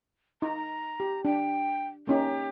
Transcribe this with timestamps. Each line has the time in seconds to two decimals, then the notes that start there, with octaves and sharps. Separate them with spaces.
0.42 D#4 A#5
1.00 G4
1.25 D4 G5
2.07 A#3 C#4 D#4 G4